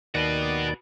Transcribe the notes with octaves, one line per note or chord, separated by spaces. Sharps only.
D#2 D#3 F#4 B4 D5